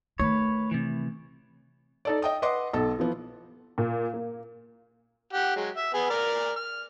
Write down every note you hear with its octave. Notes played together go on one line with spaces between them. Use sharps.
D#3 A3 B4 C#5
C3 E3
D#4 A4 D5
D#5 G5 D#6
B4 D#5 F#5 C6 D6 D#6
B1 A4
E3 F3 B3
A#2
A#3
G4 F#5
F#3 G#3
E5
B3 G#4
A#4 D5 F6
F6